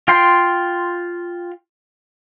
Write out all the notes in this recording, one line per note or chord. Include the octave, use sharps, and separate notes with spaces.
F4 G5 C6